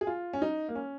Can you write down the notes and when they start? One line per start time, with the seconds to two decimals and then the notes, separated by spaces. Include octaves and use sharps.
0.01 G#4
0.07 F4
0.33 C#4
0.42 D#4
0.69 A#3
0.75 C#4